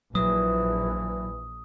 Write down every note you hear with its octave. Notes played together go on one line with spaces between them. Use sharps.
A#1 E3 F#3 D#6